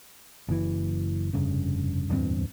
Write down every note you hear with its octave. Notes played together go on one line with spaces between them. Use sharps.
F#1 E3
F1 G2 C#3
D1 E2 G2 C4